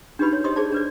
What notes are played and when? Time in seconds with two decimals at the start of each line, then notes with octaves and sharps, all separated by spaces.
0.19 D4 D#4 F#4 G4 B4 B5
0.33 C#5
0.44 G4 C5 D#5 C6 D#6
0.56 G#4 C5 D5 A5
0.72 D4 B4 D5